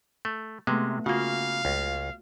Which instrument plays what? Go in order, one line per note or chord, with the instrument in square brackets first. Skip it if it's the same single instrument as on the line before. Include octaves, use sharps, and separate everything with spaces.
[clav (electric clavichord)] A3
[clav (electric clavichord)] C3 G#3 [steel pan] A3 B3
[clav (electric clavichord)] C#3 A#3 [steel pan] F4 F#4 [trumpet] F5
[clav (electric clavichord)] C#2